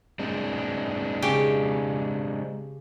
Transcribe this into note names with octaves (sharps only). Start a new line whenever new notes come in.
G#3 C4 D4
C#3 G4